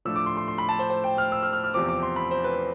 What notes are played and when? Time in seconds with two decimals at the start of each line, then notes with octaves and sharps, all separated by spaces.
0.05 A2 F3 A3 D4 E6
0.16 D6
0.26 C6
0.37 C6
0.48 C6
0.58 B5
0.69 A5
0.79 C5
0.90 C5
1.04 G5
1.18 F6
1.32 E6
1.43 F6
1.53 F6
1.64 F6
1.74 E2 C3 F3 C4 D6
1.89 D6
2.03 C6
2.16 B5
2.31 C5
2.44 B4